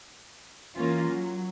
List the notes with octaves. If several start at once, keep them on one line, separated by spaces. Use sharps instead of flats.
E3 A#3 C#4 F4
F#3